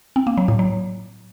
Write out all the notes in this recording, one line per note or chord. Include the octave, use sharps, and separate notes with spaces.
C4
A#3
F#3
A2
F#3